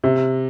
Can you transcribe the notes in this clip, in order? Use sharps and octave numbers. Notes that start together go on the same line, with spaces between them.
C3